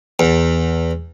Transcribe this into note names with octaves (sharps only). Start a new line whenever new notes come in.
E2